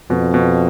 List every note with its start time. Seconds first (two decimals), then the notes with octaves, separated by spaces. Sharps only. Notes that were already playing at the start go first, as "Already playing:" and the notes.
0.10 F2 B2
0.34 B2